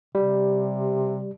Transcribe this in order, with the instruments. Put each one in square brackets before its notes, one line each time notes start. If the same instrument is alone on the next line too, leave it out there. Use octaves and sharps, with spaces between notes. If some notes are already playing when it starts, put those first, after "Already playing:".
[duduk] C3 [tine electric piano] G3